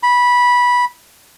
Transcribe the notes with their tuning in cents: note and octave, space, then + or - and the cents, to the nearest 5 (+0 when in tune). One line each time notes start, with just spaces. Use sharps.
B5 -15